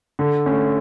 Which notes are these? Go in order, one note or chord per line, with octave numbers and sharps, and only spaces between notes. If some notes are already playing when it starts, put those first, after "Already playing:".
D3
A3 C#4